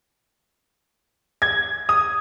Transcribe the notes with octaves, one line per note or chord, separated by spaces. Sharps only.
G#6
D#6